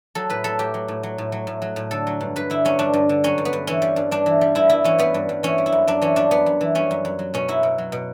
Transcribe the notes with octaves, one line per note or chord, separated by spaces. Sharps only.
F#3 A4
A2 B4
F#3 A4
A2 G4
F#3
A2
F#3
A2
F#3
A2
F#3
A2
D3 A4
F#3
G2
G2 B4
D3 E4
F#3 C#4
G2 D4
G2
D3
F#3 C#4
G2
B3
G2
E3 C#4
G3
G2
G2 D4
E3
G3
G2 E4
G2 E4
E3 C#4
G3 B3
G2
G2
E3 C#4
G3
E4
F#2
F#2 D4
E3 C#4
G3 D4
F#2 B3
F#2
E3
G3 C#4
F#2
F#2
F#3
B2 C#4
F#3 E4
B2
F#3
B2